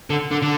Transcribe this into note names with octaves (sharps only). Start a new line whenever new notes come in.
D3
D3
D3